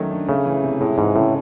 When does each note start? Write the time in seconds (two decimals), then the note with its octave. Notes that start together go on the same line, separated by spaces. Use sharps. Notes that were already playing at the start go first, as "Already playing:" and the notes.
Already playing: D#3 F#3 A3 C#4
0.11 D4
0.28 C#3 A3
0.45 E3
0.64 C3
0.81 A2 G#3
0.98 G#2 E3
1.16 A2 C#3